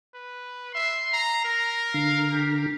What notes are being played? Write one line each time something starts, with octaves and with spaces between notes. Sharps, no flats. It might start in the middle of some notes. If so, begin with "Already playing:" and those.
B4
E5 C6
A#5
A#4 A#5
D3 F5
G4